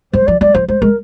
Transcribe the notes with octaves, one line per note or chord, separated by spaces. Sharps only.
G3 C5
F3 D5
G3 D5
F3 C5
G#3 C5
G#3 A#4